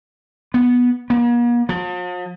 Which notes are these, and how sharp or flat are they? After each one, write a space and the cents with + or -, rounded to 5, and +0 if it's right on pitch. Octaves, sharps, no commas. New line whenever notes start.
B3 -10
A#3 +45
F3 +45